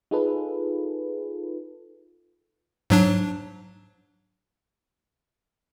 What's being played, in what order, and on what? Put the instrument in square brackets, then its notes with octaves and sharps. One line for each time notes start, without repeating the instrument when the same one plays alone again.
[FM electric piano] D#4 F4 G#4 A4 B4
[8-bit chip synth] G#2 F#3 D4